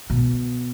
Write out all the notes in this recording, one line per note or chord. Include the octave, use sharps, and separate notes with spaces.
B2